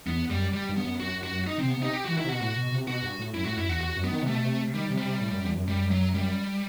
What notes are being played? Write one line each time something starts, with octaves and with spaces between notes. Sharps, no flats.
E2 B3
F#2 G3
G3
G2
B3
F#2
F#2 F#4
F#2
F#4
F#2
D#4
C3 C4
B3
C3 D#4
G4
E3 F#4
D#3 E4
C3
F#4
B2
A2 F#4
B2
C3
B2 F#4
G2
A2
F#2 E4
A2 F#4
F#2 E4
E2 F#4
E2 F#4
F#2
B3
D#3
C3 A3
B2
C3
C3
D#3 G3
C3
G3
C3
A2
F#2
E2
F#2
F#2 G3
F#3
G3